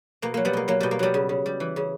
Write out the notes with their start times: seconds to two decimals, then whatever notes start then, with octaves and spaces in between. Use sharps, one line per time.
0.22 B2 A#3
0.34 F#3 A#3
0.45 G3 B3
0.53 B2 A#3
0.68 F#3 A#3
0.80 B2 G3
0.91 A#3
0.99 F#3 G3 B3
1.14 C#3
1.29 C#3
1.46 G3
1.60 E3
1.76 C#3